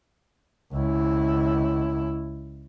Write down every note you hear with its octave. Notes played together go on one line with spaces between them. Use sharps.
C#2 E4